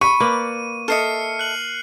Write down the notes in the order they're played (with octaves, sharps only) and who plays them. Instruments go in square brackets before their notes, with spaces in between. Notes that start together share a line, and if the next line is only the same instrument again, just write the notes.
[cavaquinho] B5 [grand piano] C#6 [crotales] D#7
[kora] A#3 B4 D5
[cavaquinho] A4 D#5 E5 [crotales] F6 C7 C#7
[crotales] F#6 F#7